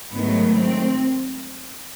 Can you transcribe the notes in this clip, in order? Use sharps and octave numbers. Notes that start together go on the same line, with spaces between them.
G#2 D#3 F#3 A3 B3
C4